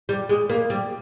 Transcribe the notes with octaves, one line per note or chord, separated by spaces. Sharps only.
G3
G#3
A#3
G3